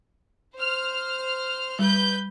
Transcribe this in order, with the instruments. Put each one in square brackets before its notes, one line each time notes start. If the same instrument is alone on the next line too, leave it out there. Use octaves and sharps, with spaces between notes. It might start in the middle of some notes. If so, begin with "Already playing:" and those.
[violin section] C5 F6
[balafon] G3 [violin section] B4 G6